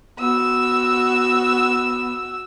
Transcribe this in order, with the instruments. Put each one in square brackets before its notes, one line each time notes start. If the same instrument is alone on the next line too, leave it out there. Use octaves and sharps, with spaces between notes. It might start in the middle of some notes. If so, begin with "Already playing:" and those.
[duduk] B3 [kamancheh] F#4 E6